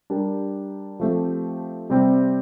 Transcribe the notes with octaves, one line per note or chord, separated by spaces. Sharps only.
G3 D4 G4 A#4
F3 A3 C4 G4
C3 G3 C4 G4